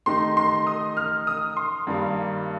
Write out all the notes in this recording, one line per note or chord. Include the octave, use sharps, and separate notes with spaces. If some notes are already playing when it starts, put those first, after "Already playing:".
D#3 A3 D#4 G4 C6
C6
D#6
F6
D#6
C6
G2 D#3 G3 A#3